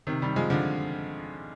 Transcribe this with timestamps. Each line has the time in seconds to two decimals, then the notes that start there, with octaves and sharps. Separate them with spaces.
0.07 C3 D#3
0.22 D#3 G3
0.36 F3 G#3
0.50 D3 F3